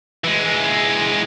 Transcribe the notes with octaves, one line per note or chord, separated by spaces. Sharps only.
E3 G#3